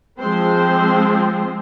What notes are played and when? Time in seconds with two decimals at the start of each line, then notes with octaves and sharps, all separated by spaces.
0.20 F3 G#3 C4 C5